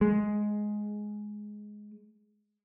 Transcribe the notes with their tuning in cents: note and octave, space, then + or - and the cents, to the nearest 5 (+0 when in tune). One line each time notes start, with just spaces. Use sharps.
G#3 +10